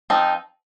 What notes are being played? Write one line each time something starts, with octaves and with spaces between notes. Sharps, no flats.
F3 C4 D#4